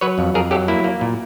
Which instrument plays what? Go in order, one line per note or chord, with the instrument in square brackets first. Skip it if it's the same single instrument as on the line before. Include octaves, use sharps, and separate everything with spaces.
[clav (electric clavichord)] F#3 B4 C#5
F2
F2 G#4 A#4
F#3 G4 A4
A#3 E4
A#3
A#2